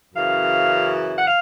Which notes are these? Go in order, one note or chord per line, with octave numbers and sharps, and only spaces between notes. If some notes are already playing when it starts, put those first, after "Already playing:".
F#2 C#3 E3 F5
F#5
F5